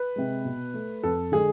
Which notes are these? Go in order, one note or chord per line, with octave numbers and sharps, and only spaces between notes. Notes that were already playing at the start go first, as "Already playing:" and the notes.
Already playing: B4
C3 G#3
B2
A3
F2 A4
D3 G#3 G#4